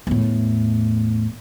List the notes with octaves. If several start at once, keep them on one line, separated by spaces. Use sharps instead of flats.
E2 A2